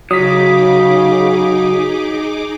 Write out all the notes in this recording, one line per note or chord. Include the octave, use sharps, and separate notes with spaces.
C#3 F#3 D#4 G#4 D6 D#6 B6